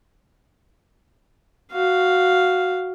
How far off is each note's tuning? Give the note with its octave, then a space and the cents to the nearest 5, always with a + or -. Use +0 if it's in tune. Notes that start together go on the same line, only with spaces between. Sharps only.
F#4 +0 F5 +0